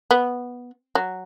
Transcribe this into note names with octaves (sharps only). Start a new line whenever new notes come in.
B3
F#3